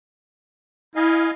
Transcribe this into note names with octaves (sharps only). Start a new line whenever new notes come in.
E4 D#5 F5 G#5